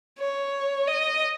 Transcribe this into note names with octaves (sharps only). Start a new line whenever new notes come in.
C#5
D#5